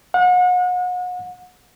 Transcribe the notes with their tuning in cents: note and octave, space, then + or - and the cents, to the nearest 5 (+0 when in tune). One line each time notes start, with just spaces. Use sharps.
F#5 -40